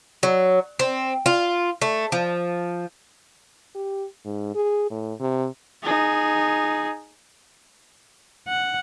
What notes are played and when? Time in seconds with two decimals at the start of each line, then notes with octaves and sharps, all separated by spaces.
0.23 F#3
0.79 C4
1.26 F4
1.82 A3
2.12 F3
3.75 G4
4.25 G#2
4.55 G#4
4.91 A2
5.20 C3
5.83 D#4 G#4
8.48 F#5